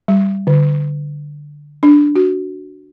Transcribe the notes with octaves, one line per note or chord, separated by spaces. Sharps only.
G3
D3
D4
F#4